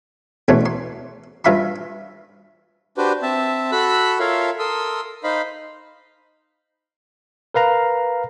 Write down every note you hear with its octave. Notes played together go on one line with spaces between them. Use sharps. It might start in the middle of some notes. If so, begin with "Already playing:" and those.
E2 B2 A3 C#5 C6
C6
G2 F4 E5 B5 C6
D4 F#4 G4 B4 C5
C4 E5 A5
F#4 A4 B5 E6 F#6
F4 A4 A#4 C#5 E5 F5
A4 A#4 C6 D#6 E6
D#4 C5 D#5 F5 B5
A#4 B4 F5 A#5